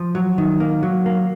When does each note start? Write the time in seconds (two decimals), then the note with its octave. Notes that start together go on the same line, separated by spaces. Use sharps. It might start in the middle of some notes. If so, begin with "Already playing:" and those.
Already playing: F3
0.15 F#3
0.38 D#3
0.60 A#3
0.83 F#3
1.06 A#3